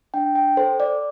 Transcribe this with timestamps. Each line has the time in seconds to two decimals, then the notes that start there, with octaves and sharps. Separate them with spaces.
0.14 D4 G5
0.35 G5
0.57 A4 C5
0.80 D5